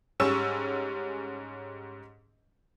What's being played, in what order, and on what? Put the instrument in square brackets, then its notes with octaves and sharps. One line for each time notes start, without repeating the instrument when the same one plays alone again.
[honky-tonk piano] G#2 G3 C#4 C#6 E6 E7